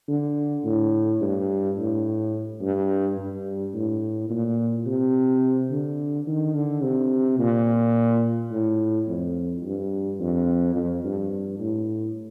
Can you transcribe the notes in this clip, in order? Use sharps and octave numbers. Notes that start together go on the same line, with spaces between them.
D3
A2
G2
A2
G2
G2
A2
A#2
C3
D3
D#3
D3
C3
A#2
A2
F2
G2
F2
F2
G2
A2